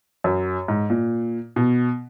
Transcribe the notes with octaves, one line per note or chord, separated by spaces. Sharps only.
F#2
G#2
A#2
B2